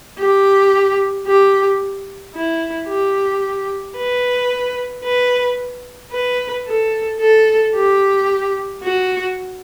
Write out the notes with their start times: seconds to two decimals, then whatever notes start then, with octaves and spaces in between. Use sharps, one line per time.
0.19 G4
1.27 G4
2.35 E4
2.88 G4
3.97 B4
5.04 B4
6.12 B4
6.67 A4
7.20 A4
7.75 G4
8.83 F#4